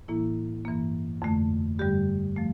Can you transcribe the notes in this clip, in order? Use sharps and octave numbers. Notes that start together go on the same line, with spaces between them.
A2 E3 A#3 E4
G2 E3 A#3
F2 D3 A3
G2 D3 G3 G4
F3 A3